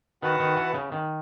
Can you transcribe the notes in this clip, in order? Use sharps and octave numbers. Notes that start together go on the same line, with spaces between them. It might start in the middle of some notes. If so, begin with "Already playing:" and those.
D#3 F#4 B4 F#5 A5
D#3
E3
C#3
D#3